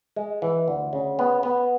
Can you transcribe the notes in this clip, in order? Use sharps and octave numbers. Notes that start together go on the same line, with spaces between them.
G#3
E3
D2
C#3
B3
B3